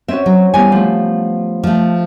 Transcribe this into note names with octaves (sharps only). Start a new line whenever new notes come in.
C4 C#4 F#4 E5
F#3
E3 G3 B3 G#5
F3 A3
F3 A3